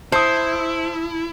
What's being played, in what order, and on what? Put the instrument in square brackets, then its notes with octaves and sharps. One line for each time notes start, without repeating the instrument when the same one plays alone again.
[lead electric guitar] E4 [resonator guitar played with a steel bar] C5 [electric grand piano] A5 D#6